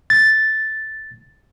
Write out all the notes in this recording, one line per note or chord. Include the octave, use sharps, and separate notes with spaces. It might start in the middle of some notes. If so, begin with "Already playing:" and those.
A6